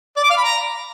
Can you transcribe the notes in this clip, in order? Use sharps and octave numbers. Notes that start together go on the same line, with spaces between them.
D5
D6
F5
B5
A#5